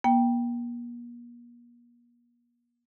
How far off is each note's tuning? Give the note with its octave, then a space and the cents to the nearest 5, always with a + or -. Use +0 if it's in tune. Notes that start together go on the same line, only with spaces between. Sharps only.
A#3 +45 G5 +0